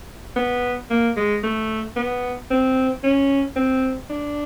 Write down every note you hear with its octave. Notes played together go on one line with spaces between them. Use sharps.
B3
A#3
G#3
A3
B3
C4
C#4
C4
D4